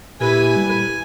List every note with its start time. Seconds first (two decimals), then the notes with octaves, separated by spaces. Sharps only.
0.20 A#2 E4 G4 B4 G#5
0.56 G3